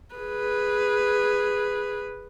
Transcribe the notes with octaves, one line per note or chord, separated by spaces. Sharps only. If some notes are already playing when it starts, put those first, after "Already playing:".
G#4 B4